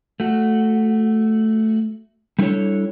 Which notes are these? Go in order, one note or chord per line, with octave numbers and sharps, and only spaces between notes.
A3 F#4
G3 A3 D4 E4 A4 C#5